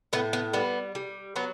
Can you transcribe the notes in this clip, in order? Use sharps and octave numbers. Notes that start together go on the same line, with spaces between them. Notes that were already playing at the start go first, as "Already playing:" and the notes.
A2 B3
B3
G3 B3
G3
F#3 B3